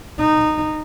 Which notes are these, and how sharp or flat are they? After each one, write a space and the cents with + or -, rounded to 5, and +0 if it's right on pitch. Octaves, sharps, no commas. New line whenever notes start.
D#4 -15